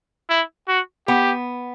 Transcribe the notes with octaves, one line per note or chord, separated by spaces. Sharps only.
E4
F#4
B3 G4